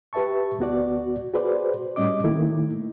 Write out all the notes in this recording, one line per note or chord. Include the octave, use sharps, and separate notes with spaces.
G4 B4 E5 A5 C#6
D2 B3 F#4 D5
F#4 G#4 B4 C5 D5
A2 G3 C#4 D#5 D6
D#3 A3 A#3 E4